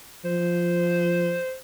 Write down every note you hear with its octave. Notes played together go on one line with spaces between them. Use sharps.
F3 C5